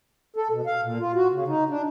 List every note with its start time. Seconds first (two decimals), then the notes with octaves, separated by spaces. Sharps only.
0.36 A4
0.50 B2
0.66 F5
0.81 A#2
1.00 F4
1.14 F#4
1.32 C#3
1.48 D#4
1.70 D4